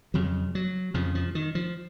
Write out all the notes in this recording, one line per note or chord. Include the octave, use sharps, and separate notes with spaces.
F2 C#3 F#3
F#3
F2 C#3 F3
F3
D#3
F3